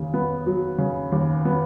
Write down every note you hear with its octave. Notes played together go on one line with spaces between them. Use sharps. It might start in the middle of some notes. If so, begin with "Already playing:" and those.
Already playing: D#2 C#3
B3
F#3
C#3
D#2
B3